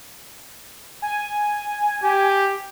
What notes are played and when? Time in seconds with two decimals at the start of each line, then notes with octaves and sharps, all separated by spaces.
1.02 G#5
2.03 G4